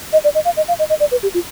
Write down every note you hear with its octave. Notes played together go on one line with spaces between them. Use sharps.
D#5
D5
D#5
F5
D#5
F5
D#5
D#5
D5
B4
G4
F4